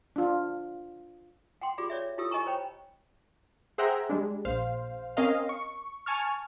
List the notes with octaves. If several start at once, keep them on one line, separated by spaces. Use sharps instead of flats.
D4 F4
F#5 G5 C6
F4 G4 G#4 D5 B5
C#5 D5 E5
E4 F4 G4 A4 E6
G4 D#5 G#5 A#5 C#6
C5 C#5 G5 B5
G#4 C5 E5 F#5 G5 A#5
G3 G#3 D4
A#1 C5 F5
C4 C#4 A#4 D#5 F5
C#6
G#5 A5 C#6 F6